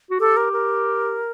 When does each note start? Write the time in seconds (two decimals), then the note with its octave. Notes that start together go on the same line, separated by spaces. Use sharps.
0.10 F#4
0.20 G4 A4
0.37 A#4
0.53 A#4